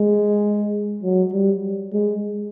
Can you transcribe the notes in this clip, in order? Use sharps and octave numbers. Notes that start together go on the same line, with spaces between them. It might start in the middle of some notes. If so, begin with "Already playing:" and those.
Already playing: G#3
F#3
G3
G#3